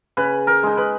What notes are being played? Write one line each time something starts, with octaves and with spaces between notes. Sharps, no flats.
C#3 B4
A#4
G#3 D#4
B4